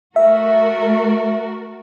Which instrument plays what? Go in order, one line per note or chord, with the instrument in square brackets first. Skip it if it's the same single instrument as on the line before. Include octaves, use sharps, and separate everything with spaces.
[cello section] A3 F#4 A#4 [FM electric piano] E5